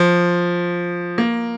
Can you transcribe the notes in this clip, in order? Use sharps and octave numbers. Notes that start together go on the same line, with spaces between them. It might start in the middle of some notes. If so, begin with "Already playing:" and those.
Already playing: F3
A#3